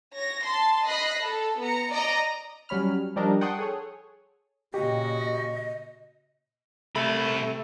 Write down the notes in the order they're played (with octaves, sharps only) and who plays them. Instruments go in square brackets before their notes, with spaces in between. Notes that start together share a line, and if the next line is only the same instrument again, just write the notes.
[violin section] C#5 A#6
A5 C6
D#5 B5 F#6 A#6 C7
A4
B3 A#5 C#7
D5 D#5 A#5
[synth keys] F#3 G3 C#4 B5 F6
F3 G3 D4 A#4 D#5
F#5 G5 A5 C6 C#6 D#6
G#4 A4 C#5
[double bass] A#2 C#3 [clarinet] F#4 [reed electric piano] G4 [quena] D#5
[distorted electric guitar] C3 B5 [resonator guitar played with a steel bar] A3